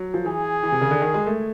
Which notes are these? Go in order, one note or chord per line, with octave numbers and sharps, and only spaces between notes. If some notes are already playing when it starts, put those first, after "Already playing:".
Already playing: F#3
F3
E3 G#4
E3
C3
C#3
D3
D#3
G#3
A3